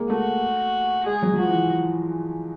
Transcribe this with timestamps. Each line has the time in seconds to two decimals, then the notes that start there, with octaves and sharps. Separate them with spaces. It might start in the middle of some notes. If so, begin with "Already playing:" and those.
Already playing: G#3 A#3
0.10 A3 F#4
1.06 G#3 G#4
1.23 F#3
1.33 F#3
1.38 F3 F#4
1.48 E3